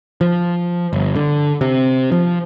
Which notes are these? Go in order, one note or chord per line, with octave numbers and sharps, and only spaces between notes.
F3
G1
D3
C3
F3